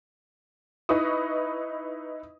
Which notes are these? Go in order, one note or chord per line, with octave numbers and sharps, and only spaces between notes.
D#4 E4 B4 D#5 C#6 D#6